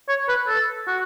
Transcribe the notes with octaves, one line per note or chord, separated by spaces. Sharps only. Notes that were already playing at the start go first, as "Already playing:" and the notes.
C#5
B4
A4
F#4